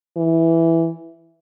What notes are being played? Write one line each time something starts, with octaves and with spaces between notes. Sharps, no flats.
E3